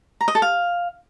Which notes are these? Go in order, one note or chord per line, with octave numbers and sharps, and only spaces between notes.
A#5
D#5
A4
F5